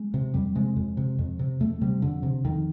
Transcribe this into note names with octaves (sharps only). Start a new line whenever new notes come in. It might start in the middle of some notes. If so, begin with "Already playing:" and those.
Already playing: G#3
C3
F2 G3
C3 G#3
F2
C3
F2
C3
F2 A3
C3 G3
F2 D3
C3
F2 D#3